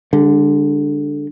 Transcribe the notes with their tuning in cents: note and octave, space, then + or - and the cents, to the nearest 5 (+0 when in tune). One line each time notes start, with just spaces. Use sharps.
D3 +0 G#3 -45